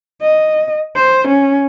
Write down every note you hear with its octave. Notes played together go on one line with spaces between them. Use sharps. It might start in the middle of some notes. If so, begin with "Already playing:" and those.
D#5
C5
C#4